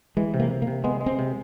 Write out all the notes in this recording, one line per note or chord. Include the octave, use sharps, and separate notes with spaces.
E3 G#3
C3
A#3
C3
A#3
C3
G#3 B3
G#3
C4
C3